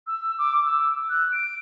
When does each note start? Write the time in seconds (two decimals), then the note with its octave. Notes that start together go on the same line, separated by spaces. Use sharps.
0.07 E6
0.39 D6
0.66 E6
1.09 F#6
1.32 D7